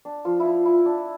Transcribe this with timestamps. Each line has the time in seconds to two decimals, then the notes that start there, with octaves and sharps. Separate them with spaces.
0.05 D4
0.25 F3 F4
0.40 E4
0.45 F3 F4
0.65 E4
0.86 D4